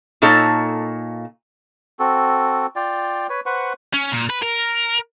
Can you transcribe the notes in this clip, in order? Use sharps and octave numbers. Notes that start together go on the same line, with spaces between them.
A#2 A#3 D#4 A4 C#5
C4 F#4 A4
F4 D5 G5
B4 C#5
B4 C5 F#5 C#6
C#4
A#2
B4
A#4